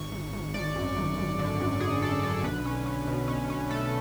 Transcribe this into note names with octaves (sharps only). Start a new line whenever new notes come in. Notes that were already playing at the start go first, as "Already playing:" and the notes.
Already playing: G#1 C#6
G#1
G#1
G#1 D5
F#2
G#1
G#1
D3
F#2
F#2 G#4
F#2 A4
D3 A4
B1 B4
C#4
C#4
B2
C#4
C#4
A3 A4